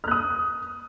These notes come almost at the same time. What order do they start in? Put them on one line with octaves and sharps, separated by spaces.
F6 F#6 D#6